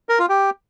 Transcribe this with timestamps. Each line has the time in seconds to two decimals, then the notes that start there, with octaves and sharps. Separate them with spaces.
0.09 A#4
0.19 F4
0.29 G4